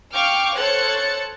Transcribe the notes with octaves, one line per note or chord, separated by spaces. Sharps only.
F5 G5 C#6 D6 F6
A4 C5 C#5 F#6 A6 C#7